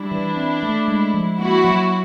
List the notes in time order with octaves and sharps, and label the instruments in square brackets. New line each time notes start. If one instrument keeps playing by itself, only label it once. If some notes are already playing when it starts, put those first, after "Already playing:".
Already playing: [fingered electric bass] G3 [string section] D4 E4
[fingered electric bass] E3
C4
A3
G#3
F3
[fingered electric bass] A#3 [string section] E4 F#4
[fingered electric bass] F#3